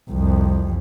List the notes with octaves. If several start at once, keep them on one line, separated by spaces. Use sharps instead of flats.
C2 F2